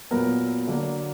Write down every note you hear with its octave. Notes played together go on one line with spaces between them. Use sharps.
A#2 F#3 B3 A#4
D3 F#3 A#3 D4